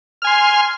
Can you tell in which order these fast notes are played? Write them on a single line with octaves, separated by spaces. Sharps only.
F6 G#5 C6